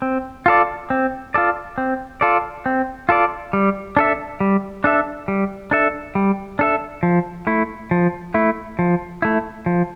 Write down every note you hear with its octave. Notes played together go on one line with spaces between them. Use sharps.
C4
F4 A4 D5
C4
F4 A4 D5
C4
F4 A4 D5
C4
F4 A4 D5
G3
D4 A4 E5
G3
D4 A4 E5
G3
D4 A4 E5
G3
D4 A4 E5
F3
A3 E4
F3
A3 E4
F3
A3 E4
F3